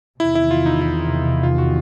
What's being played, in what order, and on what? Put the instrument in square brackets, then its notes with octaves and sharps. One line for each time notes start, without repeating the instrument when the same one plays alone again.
[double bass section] E2 C3 D#3 [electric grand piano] E4
[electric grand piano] E4
F4
D#4
E4
F4
F#4